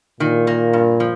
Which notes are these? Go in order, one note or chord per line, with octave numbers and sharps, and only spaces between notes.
A#2 D#3
A#3
G2
F3